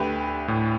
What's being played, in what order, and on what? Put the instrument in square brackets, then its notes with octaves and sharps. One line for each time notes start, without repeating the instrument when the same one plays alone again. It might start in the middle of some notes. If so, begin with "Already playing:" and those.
Already playing: [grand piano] D2 D3 A3 G4 B4
[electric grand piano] A2